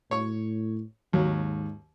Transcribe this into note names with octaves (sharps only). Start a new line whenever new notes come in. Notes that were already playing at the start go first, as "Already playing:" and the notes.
A2 C#5 C#6
D#2 G#2 F#3